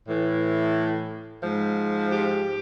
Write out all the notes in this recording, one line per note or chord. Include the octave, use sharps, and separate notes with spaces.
A2 E3
G#2 F3
G4